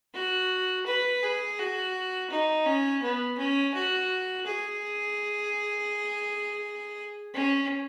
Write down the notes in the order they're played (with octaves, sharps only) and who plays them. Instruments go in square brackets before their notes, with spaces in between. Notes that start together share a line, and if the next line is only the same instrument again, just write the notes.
[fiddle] F#4
B4
G#4
F#4
D#4
C#4
B3
C#4
F#4
G#4
C#4